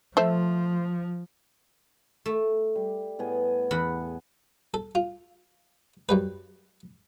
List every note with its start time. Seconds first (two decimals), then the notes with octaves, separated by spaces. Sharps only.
0.17 F3 A3 C5 E5
2.26 A3
2.76 G3
3.19 A2 B3 G#4
3.71 E2 F#5 B5
4.74 A4
4.95 F4
6.09 F#2 G3 B4